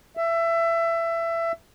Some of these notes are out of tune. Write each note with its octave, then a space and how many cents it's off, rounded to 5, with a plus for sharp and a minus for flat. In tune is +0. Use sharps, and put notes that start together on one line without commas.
E5 +20